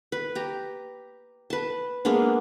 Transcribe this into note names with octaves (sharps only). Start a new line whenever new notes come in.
B4
G4 A#5
B4 A5
G#3 A#3 B3 D4